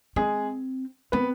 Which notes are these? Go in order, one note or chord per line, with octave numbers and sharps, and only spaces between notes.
G#3 C4 G#4
B3 C4 B4